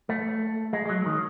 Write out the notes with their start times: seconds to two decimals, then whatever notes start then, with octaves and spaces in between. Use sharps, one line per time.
0.09 A3
0.73 G#3
0.86 G#3
0.89 F#3
1.06 D#3